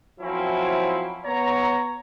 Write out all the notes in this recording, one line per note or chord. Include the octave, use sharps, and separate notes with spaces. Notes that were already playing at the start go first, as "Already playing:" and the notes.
F3 F#3 A#3 C4 C#4 E4
B3 C#5 A#5